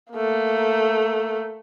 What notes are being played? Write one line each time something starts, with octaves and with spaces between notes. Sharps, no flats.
A3 A#3